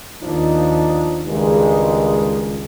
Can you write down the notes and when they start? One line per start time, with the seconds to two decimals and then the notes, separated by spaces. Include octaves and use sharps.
0.22 D#2 F3 D4 D#4
1.26 C#2 G2 D#3 G#3